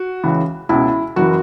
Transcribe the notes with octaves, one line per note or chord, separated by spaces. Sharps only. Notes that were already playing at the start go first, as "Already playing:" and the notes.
Already playing: F#4
C#2 C#3 E3
C#2 B2 E4
F#1 E3 F#4